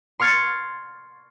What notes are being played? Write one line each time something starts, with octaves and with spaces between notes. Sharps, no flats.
C6 C#6 F6 G#6 A6 C#7